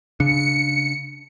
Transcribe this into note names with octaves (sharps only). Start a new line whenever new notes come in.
C#3 D4 C#7